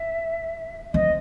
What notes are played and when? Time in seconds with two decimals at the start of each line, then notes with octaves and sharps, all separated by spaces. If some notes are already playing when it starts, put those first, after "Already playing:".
Already playing: E5
0.94 C4 D#5